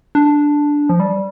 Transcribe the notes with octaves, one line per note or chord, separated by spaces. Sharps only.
D4
F3
G3